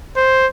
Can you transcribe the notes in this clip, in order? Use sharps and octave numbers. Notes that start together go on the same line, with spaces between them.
C5